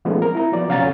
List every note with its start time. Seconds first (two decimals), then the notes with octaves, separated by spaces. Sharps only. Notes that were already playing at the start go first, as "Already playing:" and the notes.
0.05 D#3 F3 G#3 A3 B3 C#4
0.22 C4 A#4
0.35 E4 A#5
0.52 F3 F#3 B3 D5
0.68 C3 C#4 F5 F#5 A#5 A6
0.80 F2 D3 C#4